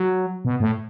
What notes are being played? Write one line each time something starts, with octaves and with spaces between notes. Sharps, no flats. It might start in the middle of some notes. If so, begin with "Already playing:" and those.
Already playing: F#3
B2
A2